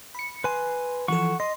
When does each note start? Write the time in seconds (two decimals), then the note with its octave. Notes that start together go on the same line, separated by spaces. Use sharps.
0.15 B5 C#7
0.44 B4 G#5 C6
1.08 E3 F3 A4 F#5 C#6
1.40 D#5 C6